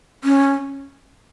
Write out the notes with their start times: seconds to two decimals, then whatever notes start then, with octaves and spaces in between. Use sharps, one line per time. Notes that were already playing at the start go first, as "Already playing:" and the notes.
0.24 C#4